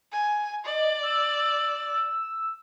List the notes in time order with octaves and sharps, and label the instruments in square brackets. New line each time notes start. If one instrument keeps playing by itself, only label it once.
[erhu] G#5
[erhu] D5 [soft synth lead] D#5
[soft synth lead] E6